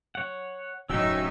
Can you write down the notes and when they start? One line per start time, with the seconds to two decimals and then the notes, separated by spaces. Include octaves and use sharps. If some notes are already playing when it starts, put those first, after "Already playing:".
0.15 C#5 F#5
0.90 D1 C#4 D#4 F#4 C#5 E5 G5 E6